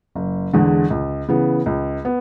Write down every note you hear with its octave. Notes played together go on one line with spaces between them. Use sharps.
F#1
E2 D3 G#3
C#2
C#3 E3 B3
C#2
B3